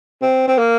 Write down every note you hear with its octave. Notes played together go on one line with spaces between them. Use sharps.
C4
C4
A#3